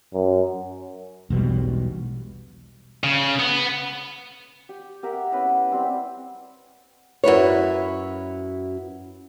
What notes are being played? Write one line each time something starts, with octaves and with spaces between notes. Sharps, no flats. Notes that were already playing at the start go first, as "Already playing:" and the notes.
F#2
E1 B1 B2 G3
C#3
B3
G4
G4 A#4 E5 F#5
B3 C#4 E4 B4
G3 C4 E4
F#2 E4 B4 C#5